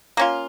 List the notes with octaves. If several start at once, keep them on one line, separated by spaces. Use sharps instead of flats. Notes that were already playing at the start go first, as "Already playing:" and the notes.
A#3 C#4 F4